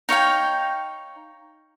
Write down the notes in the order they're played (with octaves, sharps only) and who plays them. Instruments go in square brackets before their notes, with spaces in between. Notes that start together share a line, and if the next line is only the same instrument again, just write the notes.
[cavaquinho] D#4 C#5 F5 G5